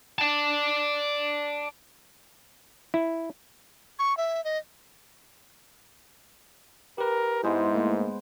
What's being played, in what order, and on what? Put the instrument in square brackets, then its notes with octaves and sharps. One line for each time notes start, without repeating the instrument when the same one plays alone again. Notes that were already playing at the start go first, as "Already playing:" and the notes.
[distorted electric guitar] D5 A5
[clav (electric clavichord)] E4
[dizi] C#6
E5
D#5
[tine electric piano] G4 B4 [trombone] A#4
[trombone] G#2 [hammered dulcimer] G#3 B3 C5 [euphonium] E4
[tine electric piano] A3 A#3